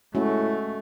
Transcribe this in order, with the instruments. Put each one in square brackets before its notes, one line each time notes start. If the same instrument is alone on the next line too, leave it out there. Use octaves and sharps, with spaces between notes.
[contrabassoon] A2 [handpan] G#3 C#4 F#4 [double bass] A3